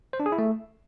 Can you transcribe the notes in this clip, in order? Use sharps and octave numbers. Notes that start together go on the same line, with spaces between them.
C5
D4
G#4
E4
A3